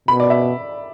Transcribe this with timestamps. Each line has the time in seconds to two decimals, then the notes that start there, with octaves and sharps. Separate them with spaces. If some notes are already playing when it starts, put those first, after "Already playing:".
0.08 B2 B5
0.20 D5
0.30 E5